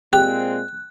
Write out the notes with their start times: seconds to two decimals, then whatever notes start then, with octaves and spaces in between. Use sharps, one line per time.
0.13 A#2 G#3 C4 G4 G5 F#6